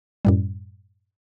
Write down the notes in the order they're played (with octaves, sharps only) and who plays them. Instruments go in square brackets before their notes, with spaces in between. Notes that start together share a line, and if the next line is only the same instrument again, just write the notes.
[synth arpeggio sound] F#2 A2 G3